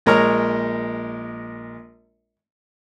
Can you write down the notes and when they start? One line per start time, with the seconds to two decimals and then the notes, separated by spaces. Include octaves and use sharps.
0.06 A#1 G#3 A#4 C#5 A#5 F6